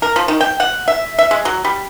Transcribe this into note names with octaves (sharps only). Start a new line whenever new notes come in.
A#4
F3
D#3
G5
F#5
E5
E5
G#3
F#3
G3